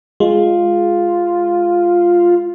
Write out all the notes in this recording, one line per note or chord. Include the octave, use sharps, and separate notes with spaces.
G#3 F4